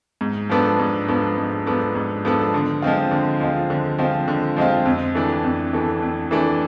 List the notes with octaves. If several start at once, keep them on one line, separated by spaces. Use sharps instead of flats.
G#2
F3 B3 D4 A4
G#2
F3 B3 D4 A4
G#2
F3 B3 D4 A4
G#2
F3 B3 D4 A4
D3
F3 G#3 C4 F4
D3
F3 G#3 C4 F4
D3
F3 G#3 C4 F4
D3
F3 G#3 C4 F4
F2
E3 A3 D4
F2
E3 A3 D4
F2
E3 A3 D4